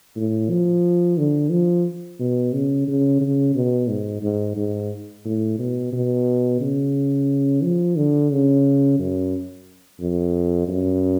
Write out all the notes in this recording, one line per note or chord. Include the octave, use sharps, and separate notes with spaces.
A2
F3
D3
F3
B2
C#3
C#3
C#3
B2
G#2
G#2
G#2
A2
B2
B2
C#3
F3
D3
C#3
F#2
F2
F#2